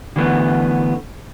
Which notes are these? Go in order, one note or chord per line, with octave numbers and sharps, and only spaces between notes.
D3 E3 A3 B3